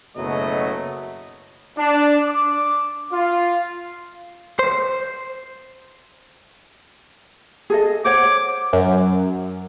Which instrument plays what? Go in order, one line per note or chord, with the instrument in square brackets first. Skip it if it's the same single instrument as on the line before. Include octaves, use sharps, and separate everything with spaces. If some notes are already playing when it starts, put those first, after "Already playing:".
[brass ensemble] F#1 B2 F#3 A3 D#5
[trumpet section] D4
D6
F4
[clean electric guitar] C5
[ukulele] G#4 A4 D#5
[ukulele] C5 C#5 F#5 [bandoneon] D6
[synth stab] F#2